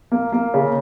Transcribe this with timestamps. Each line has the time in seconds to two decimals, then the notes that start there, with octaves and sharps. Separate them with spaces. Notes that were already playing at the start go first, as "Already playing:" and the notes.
0.12 A#3
0.33 A#3
0.54 C#3